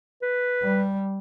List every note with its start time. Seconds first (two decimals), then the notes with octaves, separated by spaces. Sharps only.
0.22 B4
0.63 G3